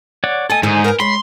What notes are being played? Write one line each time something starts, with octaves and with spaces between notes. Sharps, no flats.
C#5 D5 F#5
A3 A4 D#5 G#5
G#2 D3 D#3 D#4 C5 G#5
A#4 B4
G#3 C#5 B5 C6